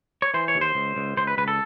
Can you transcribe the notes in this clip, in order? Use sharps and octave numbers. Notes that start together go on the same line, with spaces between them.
C#5
E3 C5
C#5
D#2
C5
C#2
C#2
C#2 C5
B4
C#2 B4
A4